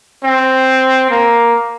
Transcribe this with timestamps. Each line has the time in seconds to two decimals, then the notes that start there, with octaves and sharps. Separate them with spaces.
0.24 C4
1.11 A#3